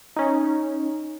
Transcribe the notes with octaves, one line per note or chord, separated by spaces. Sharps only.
C#4 D#4